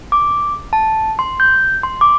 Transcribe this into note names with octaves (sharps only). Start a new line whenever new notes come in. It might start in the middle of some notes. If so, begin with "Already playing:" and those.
D6
A5
C6
G6
C6
D6